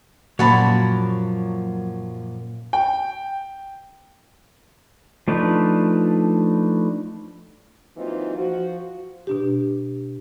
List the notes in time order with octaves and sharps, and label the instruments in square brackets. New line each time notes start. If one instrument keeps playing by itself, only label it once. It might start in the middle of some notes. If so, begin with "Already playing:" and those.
[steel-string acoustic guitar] F#2 F3 A#3 [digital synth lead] A#2 [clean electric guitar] F#3 [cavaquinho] F#5 A5 B5
[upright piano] G5
[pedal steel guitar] F3 A3 D4 D#4 B4
[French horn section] E3 F#3 A#3 C4 D#4 F4
F3 F#4
[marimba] B2 D4 G4